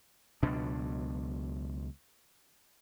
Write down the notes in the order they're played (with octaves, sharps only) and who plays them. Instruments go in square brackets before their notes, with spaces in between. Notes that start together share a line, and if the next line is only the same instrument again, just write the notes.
[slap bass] C#2 B2 F#3 D4